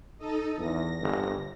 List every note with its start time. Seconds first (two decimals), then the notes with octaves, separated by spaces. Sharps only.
0.18 D#4 A4 D#5
0.57 E2 A#6
1.00 G1